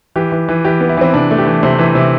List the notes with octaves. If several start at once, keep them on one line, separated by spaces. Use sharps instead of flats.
E3 G4
E3
E3
E3 G4
B3
E4
E3 C4
C3 D4
A3
G4
E3
C3 C5
E3
C3